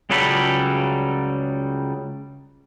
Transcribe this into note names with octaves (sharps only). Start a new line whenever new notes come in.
C#2 C#3 F#3 G3 A4 B5